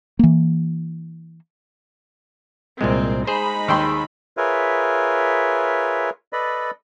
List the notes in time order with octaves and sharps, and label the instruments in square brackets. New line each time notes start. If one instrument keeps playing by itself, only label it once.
[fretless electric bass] E3 A#3
[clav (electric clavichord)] C2 A#2 G#3 [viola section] C4
[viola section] G#3 D#4 B5 [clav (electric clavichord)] G#4 C5
[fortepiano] D#2 G5 C6
[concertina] F4 G#4 A#4 B4 C#5 E5
A4 B4 D5 D#5 B5